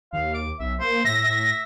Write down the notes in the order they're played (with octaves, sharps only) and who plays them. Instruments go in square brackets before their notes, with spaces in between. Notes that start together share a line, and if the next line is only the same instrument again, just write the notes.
[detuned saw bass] D#2 [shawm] F5
[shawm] D6
[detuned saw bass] B1 [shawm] E5
[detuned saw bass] A#3 [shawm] C5
[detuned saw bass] A2 [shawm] E5 [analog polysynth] A#6
[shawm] E5